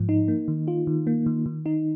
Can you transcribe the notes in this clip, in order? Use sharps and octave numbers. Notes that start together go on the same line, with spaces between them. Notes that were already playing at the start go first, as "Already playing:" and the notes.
Already playing: G#2 F3
D#4
A#3
D#3
F4
D#3
A#3
D#3
D#3
D#4